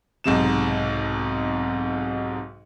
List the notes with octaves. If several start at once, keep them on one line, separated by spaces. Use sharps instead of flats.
B1 G#2 C3 E7